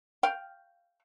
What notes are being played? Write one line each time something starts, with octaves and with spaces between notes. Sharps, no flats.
F5 G5